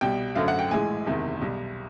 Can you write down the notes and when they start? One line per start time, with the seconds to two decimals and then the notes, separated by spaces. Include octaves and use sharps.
0.01 C2 B2 G3 G5
0.35 G#1 F#2 D3 F#3 A3 F5
0.48 F#5
0.59 G5
0.71 A#1 A2 E3 G#3 G#5
1.06 F#1 E2 C3 D#3
1.41 B1 B2 G3